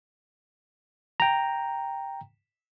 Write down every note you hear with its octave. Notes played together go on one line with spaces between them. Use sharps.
G5 A#5